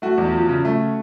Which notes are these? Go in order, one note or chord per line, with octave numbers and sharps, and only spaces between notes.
A3 F#4
E2
F3
C#3
A3